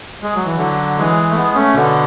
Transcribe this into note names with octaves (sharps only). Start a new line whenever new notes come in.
G#3
F#3
E3
D3 F#3
E3 G#3
A3
G#3 B3
A3 C#4
B2 D3